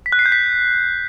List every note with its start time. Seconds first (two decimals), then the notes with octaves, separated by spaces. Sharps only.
0.06 B6
0.12 F#6
0.19 C7
0.26 G6
0.32 B6